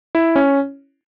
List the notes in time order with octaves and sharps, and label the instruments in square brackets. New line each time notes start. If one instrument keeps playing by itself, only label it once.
[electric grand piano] E4
C#4